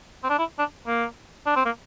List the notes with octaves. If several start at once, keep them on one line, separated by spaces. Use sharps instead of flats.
C4
D4
E4
D4
A#3
D4
C4
A#3